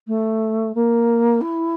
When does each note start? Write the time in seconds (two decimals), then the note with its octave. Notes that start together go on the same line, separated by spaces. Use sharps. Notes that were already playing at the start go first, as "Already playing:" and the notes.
0.07 A3
0.74 A#3
1.41 E4